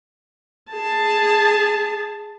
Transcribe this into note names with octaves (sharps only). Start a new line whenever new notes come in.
G#4 A5